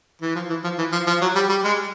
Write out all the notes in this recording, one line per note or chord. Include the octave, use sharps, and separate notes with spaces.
E3
F3
E3
F3
E3
F3
F3
F#3
G3
G3
G#3